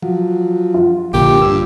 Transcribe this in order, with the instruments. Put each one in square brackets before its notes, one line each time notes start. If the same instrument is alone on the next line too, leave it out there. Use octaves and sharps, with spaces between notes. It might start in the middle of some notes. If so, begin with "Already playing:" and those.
[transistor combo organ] F3 F#3
[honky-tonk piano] F4
[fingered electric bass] A#1 D3 D4 [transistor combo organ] A#3 [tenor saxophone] G4
[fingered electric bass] G2 [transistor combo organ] E6